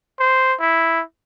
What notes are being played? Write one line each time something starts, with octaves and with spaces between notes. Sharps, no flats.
C5
E4